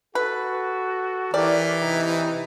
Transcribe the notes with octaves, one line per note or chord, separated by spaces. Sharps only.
F#4 A4 B4
E3 G4 A#4 D5
C3 D#4